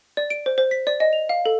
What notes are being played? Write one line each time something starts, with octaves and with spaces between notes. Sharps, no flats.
D5
D7
C5
C5
B6
D5
D#5
F7
F5
A4